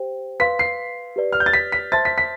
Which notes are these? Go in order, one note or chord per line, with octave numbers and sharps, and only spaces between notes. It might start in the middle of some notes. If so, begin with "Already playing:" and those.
Already playing: G4 C5 G5
B4 F5 C6 B6
C7
G4 B4 D5
F6
G6
A6
B6
B6
C5 E5 A5 C6 A6
B6
B6